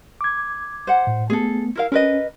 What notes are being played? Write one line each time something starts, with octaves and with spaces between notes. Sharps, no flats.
D6 G#6
C5 F#5
A2
A3 B3 G#4 A4
E4 A#4 F5
C#4 A#4 B4 D#5